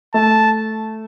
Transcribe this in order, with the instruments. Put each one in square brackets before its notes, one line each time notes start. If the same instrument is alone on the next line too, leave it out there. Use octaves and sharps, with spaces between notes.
[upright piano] A3 [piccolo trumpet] A5